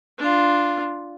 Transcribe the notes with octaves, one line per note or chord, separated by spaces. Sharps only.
D4 F4